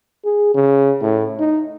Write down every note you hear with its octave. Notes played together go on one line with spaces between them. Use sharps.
G#4
C#3
A2
D#4